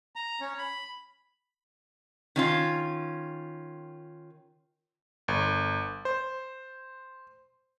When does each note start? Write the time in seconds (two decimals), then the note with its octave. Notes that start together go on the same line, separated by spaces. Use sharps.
0.16 A#5
0.41 C#4
0.58 B5
2.36 D#3 C#4 F4
5.28 G1
6.05 C5